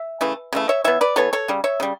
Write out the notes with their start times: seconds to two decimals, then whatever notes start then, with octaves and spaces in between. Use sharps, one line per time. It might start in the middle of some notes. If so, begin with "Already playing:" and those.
Already playing: E5
0.21 C#3 E3 A3
0.53 C#3 E3 A3
0.69 C#5 E5
0.84 E3 B3 C#5 E5
1.01 B4 D5
1.16 E3 B3 A4 C#5
1.33 A4 C#5
1.48 C#3 G3
1.64 C#5 E5
1.80 C#3 G3